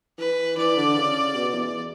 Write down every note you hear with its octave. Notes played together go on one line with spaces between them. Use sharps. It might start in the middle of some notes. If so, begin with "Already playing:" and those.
E3 B4
E3 D5
D3
C#3
B2
E2